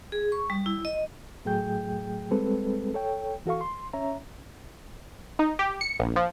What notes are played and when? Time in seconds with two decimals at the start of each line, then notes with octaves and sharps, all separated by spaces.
0.12 G#4
0.32 C#6
0.50 G3
0.66 E4
0.85 D#5
1.45 A2 F#3 A3 G#4 G5 G6
2.31 G3 G#3 C4 A4 B4
2.94 A4 C#5 G5
3.46 E3 F#4 A4 F5 C#6
3.61 C6
3.93 C#4 C#5 E5 A#5
5.39 D#4
5.59 G4
5.81 C#7
6.00 A#1
6.16 F3